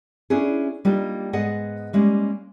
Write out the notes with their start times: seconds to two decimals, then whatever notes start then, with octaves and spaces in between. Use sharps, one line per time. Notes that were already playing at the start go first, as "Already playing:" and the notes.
0.30 C#4 D4 E4 G#4
0.85 G3 A#3 D4 D#4 F4
1.33 G#2 B3 G#4 D#5 F#5
1.93 G3 G#3 A#3 C#4